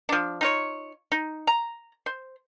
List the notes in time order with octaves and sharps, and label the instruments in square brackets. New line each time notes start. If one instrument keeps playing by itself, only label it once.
[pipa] F3 D4
D#4 F4 C#5
D#4
A#5
C5